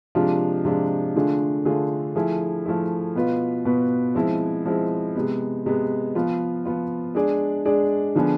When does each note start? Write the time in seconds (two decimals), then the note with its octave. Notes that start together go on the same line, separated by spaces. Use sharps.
0.15 C3 F3 G#3 D4 F4
0.65 C3 F3 G#3 D4 F4
1.16 D3 A3 D4 F4 G#4
1.65 D3 A3 D4 F4 G#4
2.16 F3 A3 E4 G#4
2.66 F3 A3 E4 G#4
3.15 B2 B3 F4 B4
3.65 B2 B3 F4 B4
4.15 F3 G#3 C4 E4
4.65 F3 G#3 C4 E4
5.15 C3 G#3 B3
5.66 C3 G#3 B3
6.15 F3 B3 F4
6.65 F3 B3 F4
7.15 G#3 D4 G#4 D5
7.65 G#3 D4 G#4 D5
8.15 D3 F3 B3 D4 G#4